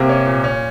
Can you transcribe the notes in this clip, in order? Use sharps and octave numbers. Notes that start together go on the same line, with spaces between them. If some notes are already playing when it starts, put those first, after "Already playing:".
Already playing: C3 A#3
C#4
A#2
C#4